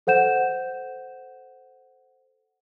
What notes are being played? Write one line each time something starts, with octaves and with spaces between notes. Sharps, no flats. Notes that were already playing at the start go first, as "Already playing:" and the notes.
A4 C5 F#5 G6 E7